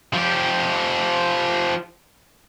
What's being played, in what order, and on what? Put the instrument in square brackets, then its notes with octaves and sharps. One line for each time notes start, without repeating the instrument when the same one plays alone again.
[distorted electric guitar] F3 G4